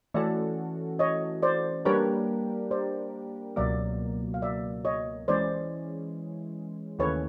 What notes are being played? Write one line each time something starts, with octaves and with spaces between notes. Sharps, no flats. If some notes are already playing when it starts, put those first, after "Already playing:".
E3 A3 C#4 F#4 A4 D5 E5
C#5 D#5
C5 D5
G3 A#3 D4 G4 A#4 B4 C#5
C5 D5
C#2 B2 F#3 A#3 D5 E5
F5
D5 E5
C#5 D#5
E3 G#3 C#4 C5 D5
D#2 C#3 E3 A3 C#4 B4 C#5